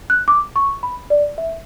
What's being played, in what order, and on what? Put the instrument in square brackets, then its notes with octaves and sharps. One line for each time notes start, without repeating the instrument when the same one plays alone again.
[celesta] F#6
D6
C#6
B5
D5
E5